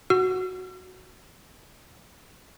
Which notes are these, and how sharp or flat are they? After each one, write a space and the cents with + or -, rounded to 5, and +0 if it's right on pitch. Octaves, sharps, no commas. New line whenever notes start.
F#4 +0 E6 +45